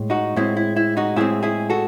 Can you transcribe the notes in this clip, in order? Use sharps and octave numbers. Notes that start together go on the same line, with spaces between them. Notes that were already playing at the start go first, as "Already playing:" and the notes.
Already playing: A2 G#3
D#4 F#4
A2 G#3 C4 E4
E4
E4
D#4 F#4
A2 G#3 C4 E4 G#4
E4 G#4
F#4 A4